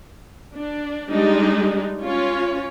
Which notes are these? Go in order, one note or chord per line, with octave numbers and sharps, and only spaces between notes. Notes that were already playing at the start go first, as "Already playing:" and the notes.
D4
G3 G#3 D4 D#4
C#4 F4 C#5